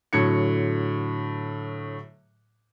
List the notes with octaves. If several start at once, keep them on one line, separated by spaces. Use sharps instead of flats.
A2 D3 F#3 G#6 C#7